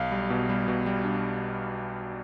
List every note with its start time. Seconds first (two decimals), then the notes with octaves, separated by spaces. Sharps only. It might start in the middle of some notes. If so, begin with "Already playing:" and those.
Already playing: B1 F5
0.12 G3
0.30 B2
0.49 G3
0.68 B2
0.86 G3
1.04 D4